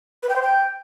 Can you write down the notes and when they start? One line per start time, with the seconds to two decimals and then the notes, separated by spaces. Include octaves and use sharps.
0.23 B4
0.29 G5
0.36 C5
0.42 G5